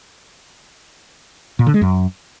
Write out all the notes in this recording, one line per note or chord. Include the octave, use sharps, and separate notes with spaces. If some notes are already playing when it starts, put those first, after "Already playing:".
A#2
D3
G#3
F#2